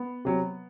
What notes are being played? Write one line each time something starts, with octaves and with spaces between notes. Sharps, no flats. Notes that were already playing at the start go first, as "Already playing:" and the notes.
Already playing: B3
C3 F#3